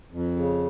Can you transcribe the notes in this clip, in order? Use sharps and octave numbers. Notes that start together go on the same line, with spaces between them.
F2
C#3